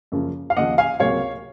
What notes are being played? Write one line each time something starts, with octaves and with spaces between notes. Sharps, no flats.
F#2 C#3 F3 A#3
F5
D#2 C#3 F3 D#5 F#5
F5 G#5
C#2 C3 F#3 A#3 C#5 F5